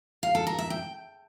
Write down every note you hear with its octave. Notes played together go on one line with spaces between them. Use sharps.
F5
A4
A#4
E5
G5